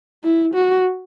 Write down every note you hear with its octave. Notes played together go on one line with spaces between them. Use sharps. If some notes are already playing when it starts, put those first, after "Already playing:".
E4
F#4